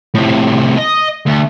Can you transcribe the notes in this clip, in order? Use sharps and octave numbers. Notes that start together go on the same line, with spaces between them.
A2 C3
D#5
D2